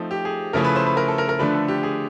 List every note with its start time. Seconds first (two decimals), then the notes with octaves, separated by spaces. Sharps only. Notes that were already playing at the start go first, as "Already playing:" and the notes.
Already playing: F3 A3 C4 D#4
0.11 G4
0.25 G#4
0.53 C#3 F3 A3 C#4 E4 A#4
0.64 B4
0.76 C5
0.86 B4
0.97 A#4
1.08 A4
1.18 A#4
1.29 A#4
1.39 D3 F3 A3 D4 B4
1.54 A4
1.68 G4
1.83 G#4